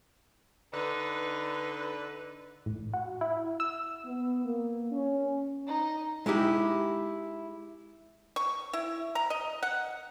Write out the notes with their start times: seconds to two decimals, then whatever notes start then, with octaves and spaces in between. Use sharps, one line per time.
0.74 D3 D#4 B4
2.66 A1
2.94 F#4
3.21 E4
3.60 E6
4.06 B3
4.45 A#3
4.92 C#4
5.67 D#4
6.26 G#3 D#4 E4 G4 G#4
8.36 C#6
8.73 E4
9.15 A#5
9.30 D#5
9.63 F#5